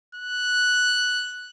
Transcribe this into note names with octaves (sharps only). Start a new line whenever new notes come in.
F#6